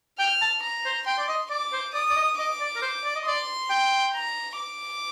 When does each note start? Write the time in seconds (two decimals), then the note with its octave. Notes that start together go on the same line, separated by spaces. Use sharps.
0.19 G5 F6
0.42 A5
0.63 A#5
0.85 C5
1.07 G5 C6
1.19 D5
1.29 D#5
1.50 D5 D6
1.73 C5
1.94 D5 D#6
2.10 D5
2.16 D#5
2.38 D#5 D6
2.60 D5
2.76 A#4
2.82 C5
3.05 D5
3.16 D#5
3.26 D5 C6
3.70 G5
4.14 A#5
4.58 D6